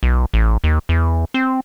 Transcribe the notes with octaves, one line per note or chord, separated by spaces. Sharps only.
B1
A1
D#2
E2
C4